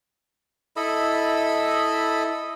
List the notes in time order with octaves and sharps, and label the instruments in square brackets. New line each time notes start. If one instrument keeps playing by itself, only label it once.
[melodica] E4 A4 D#5 B5